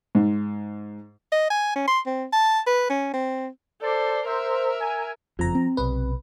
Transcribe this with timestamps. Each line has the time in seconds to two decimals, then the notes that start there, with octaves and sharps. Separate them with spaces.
0.15 G#2
1.32 D#5
1.50 G#5
1.76 C#4
1.88 C6
2.06 C4
2.33 A5
2.67 B4
2.90 C#4
3.14 C4
3.82 A4 C5 D5
4.26 A#4 C5 E5
4.80 G#5
5.39 F#1 F2 F3 A#5
5.55 C4
5.77 B1 C3 B4